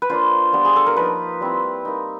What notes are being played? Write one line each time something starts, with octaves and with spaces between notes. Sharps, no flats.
B4
A#3 D4 F4 C5
G3 B3 D4 F4
G#4
A4
A#4
F3 A#3 D#4 B4
G3 C4 E4
A#3 D#4